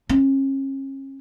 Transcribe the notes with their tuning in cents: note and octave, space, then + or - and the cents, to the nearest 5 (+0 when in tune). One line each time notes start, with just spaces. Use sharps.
C#4 -35